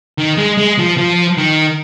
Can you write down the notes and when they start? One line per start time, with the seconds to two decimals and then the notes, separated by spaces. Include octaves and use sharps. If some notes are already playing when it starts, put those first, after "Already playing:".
0.18 D#3
0.37 G#3
0.58 G#3
0.78 F3
0.98 F3
1.37 D#3